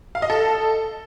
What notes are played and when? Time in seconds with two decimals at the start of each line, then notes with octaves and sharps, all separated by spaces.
0.15 F5
0.22 D#5
0.30 A4